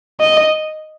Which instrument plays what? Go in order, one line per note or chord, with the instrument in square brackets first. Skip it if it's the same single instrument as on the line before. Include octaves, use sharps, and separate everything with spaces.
[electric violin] D#5